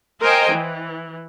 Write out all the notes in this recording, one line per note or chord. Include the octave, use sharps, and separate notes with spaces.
A#4 C5 D#5 F5 G5 G#5
E3